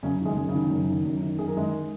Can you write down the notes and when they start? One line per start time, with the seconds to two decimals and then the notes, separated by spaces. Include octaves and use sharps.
0.03 F#2 C#3 C#4
0.21 D#3 G#3 G#4
0.37 F#2
0.48 C#3 C#4
0.55 D#3
0.71 F#2
0.89 D#3
1.05 F#2
1.22 D#3
1.38 F#2 G#4
1.47 A#4
1.56 D#3 G#3 G#4